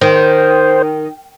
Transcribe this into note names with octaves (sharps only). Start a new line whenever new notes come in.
D#3 C5